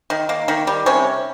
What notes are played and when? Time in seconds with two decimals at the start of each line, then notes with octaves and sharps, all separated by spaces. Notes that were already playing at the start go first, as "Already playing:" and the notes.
0.10 D#3
0.29 A#3
0.48 D#3
0.67 G3
0.86 C3 C#4